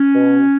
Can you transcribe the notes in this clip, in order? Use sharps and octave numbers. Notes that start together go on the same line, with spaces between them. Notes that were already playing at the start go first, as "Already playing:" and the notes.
Already playing: C#4
B2